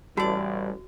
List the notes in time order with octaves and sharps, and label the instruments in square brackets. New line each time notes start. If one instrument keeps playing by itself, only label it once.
[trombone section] A1 [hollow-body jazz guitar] G3 [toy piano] F#4 [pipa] A4 D5